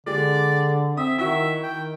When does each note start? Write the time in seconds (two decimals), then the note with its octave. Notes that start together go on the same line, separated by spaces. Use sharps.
0.07 D3 G#3 G4 D5
0.97 C4 E5 D#6
1.18 D#3 E4 F#4 E5
1.63 D#3 G5